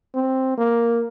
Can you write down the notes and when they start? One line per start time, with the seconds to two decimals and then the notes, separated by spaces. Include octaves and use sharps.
0.15 C4
0.58 A#3